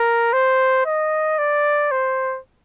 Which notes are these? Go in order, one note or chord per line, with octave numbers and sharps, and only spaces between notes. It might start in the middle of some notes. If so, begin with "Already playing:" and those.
Already playing: A#4
C5
D#5
D5
C5